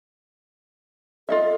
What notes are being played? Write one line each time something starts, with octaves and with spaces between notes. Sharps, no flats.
F4 A4 D#5 E5